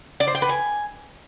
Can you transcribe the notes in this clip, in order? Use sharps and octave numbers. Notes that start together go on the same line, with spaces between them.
D5
C5
G5
B4
G#5